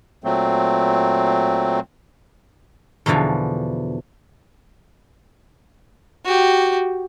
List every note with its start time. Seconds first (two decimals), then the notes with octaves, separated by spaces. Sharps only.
0.24 A#2 F#3 A3 C4
3.06 E2 B2 D3 E3 F3
6.25 F#4 G4